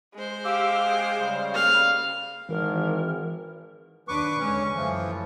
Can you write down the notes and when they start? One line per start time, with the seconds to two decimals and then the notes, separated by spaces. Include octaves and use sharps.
0.14 G#3 C5
0.45 G4 F5 D6 E6
0.84 G#4 G5
1.19 C#3 G3
1.54 F5
2.49 G#1 E3 A#4
4.08 D#2 D4 B4 C#6 D6
4.39 D3 G#3 C#4
4.73 F#2 E3 F3 A3